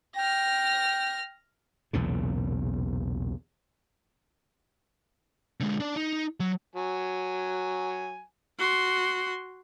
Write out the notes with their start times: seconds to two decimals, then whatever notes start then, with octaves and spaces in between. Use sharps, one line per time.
0.16 G5 F6 A#6
1.93 B1 E2 A#2 C#3
5.60 D3 G#3
5.80 D4 D5
5.96 D#4
6.40 F#3
6.76 F#3 G#5
8.59 F#4 C6